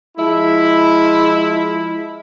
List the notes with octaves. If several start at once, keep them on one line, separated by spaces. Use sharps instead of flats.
F3 G#3 E4